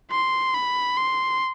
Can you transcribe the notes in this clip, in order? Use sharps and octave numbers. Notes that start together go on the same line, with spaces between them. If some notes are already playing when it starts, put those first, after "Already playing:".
C6
B5
C6